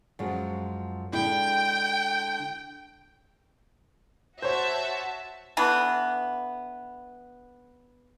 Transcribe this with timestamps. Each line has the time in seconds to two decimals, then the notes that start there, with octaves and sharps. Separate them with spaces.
0.19 F#2 F3 G#3
1.13 D3 G#3 E4 G5
4.42 F#4 C5 C#5 E5 A5
5.57 D3 E3 B3